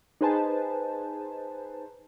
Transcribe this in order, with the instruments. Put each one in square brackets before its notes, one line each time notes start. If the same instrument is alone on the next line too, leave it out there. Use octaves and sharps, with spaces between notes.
[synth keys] D#4 G#4 B4 C5 G#5 A5